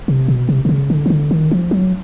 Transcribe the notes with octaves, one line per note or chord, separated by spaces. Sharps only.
C3
B2
C3
C3
C#3
D3
D#3
D3
D#3
F3
F#3